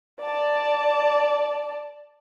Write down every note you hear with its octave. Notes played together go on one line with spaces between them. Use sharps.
D5 A5